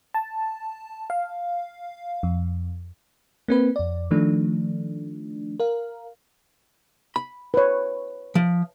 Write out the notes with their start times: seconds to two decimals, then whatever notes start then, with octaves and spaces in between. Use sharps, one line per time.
0.14 A5
1.10 F5
2.23 F2
3.48 A#3 C4 B4
3.76 F2 D5
4.11 D#3 F3 A3 D4
5.60 A#4 F5
7.16 B5
7.54 B4 C#5
8.35 F3